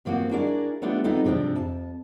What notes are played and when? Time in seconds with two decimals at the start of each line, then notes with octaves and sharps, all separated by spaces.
0.05 G2 F3 A#3 C4 F#4
0.31 D4 E4 F#4 G#4 A#4 D5
0.82 G3 A3 B3 D4 F4 G4
1.04 G3 B3 C4 D#4 F4 A4
1.24 G#2 C3 F3 C4 D4
1.56 F2 A5